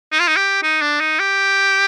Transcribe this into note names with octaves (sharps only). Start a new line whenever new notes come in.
D#4
F4
D#4
G4
D#4
D4
D#4
G4